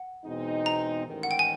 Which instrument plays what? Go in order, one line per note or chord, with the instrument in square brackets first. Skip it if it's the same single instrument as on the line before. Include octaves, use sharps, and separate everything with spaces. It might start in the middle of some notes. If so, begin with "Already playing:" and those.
Already playing: [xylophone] F#5
[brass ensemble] E2 B2 G#3 C4 D#4
[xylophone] A#5
[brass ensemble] A1 G#2 D#3
[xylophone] F#5
G5
G#5